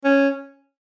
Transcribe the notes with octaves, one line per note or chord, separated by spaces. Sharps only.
C#4